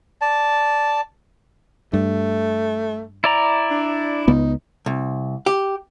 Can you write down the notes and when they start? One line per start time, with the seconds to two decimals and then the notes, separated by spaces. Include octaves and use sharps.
0.21 D5 A5
1.93 G2 A3
3.24 E4 D5 A#5
3.71 D4
4.28 C#2 B3 D#4
4.86 C2
5.46 G4